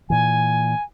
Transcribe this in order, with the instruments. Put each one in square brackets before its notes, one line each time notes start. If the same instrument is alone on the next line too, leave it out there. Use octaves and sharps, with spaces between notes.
[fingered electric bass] A#2 E3 [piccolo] G#5